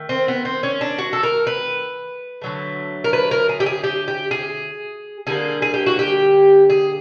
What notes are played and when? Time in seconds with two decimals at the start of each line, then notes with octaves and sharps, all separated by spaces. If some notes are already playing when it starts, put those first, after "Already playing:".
Already playing: D#3 A3
0.09 C4
0.28 B3
0.45 C4
0.63 C#4
0.81 D4
0.98 F#4
1.13 A4
1.23 A#4
1.47 B4
2.42 D3 F#3 A3
3.04 A#4
3.13 B4
3.31 A#4
3.49 G#4
3.60 G4
3.66 G#4
3.84 G4
4.08 G4
4.31 G#4
5.27 D3 G3 A#3 G#4
5.62 G#4
5.74 G4
5.86 F#4
5.99 G4
6.70 G#4